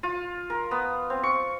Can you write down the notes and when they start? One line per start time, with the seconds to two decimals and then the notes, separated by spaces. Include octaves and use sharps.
0.03 F4
0.50 A#4
0.71 B3
1.10 C4
1.23 C#6